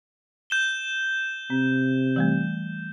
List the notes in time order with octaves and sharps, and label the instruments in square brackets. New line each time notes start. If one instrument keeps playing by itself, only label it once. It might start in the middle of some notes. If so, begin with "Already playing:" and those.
[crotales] G6 E7 G7
[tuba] C3 [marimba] C4
[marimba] E3 G3 A3